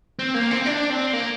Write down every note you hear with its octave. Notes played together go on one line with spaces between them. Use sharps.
C4
A#3
C4
D4
C4
A#3